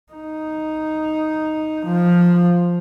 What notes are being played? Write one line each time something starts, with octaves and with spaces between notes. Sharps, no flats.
D#4
F3